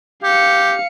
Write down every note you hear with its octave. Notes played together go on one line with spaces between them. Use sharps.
G4 F5 C#7